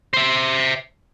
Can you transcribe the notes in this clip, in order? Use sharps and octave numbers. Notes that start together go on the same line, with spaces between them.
C5 E5